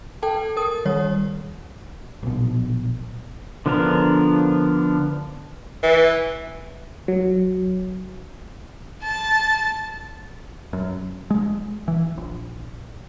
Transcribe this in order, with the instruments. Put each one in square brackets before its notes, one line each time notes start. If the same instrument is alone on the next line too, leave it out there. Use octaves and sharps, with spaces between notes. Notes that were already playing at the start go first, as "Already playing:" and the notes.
[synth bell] A4 G5 A5
A#4 D#6
D#3 G3 C#5
[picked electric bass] A#1 B2
[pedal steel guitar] D3 F3 B3 D4 A#4
[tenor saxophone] E3
[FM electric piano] F#3
[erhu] A5
[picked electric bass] F#2
G#3
E3
A#1